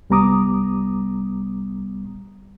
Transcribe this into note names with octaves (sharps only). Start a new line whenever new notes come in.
C2 G3 B3 A#5 D6 D#6